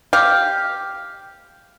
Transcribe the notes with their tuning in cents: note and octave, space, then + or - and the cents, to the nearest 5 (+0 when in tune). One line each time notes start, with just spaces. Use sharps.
G4 +0 F5 +0